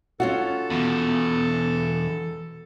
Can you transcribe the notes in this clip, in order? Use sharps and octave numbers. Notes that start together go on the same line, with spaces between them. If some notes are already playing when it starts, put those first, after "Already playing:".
C#4 F4 F#4 A4
E2 B2